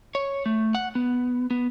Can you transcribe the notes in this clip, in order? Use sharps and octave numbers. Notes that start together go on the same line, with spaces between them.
C#5
A3
F#5
B3
B3